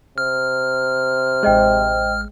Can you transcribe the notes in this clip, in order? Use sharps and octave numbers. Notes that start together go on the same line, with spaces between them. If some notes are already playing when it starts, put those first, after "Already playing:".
C3 F6
A1 G#3 C5 D#5 G5